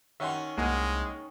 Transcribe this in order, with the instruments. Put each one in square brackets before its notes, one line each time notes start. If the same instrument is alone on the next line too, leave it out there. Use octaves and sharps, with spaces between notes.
[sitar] D#3 C#4 [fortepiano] E5 F#5 C6
[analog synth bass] C2 [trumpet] G#3 [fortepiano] A#3 F#5 G#5